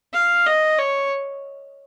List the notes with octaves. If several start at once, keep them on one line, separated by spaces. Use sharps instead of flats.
F5
D#5
C#5